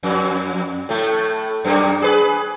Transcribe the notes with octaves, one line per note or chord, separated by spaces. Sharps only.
F2
A2 A3
F#2 A#3
G#4 B4